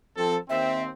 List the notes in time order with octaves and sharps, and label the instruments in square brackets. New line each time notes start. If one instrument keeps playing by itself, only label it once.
[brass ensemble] F3 C4 A4
[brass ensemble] D#2 C4 [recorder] E5